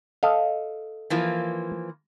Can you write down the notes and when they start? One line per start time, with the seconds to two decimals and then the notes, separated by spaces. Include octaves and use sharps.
0.23 A4 D#5 F5
1.10 E3 F3 A#3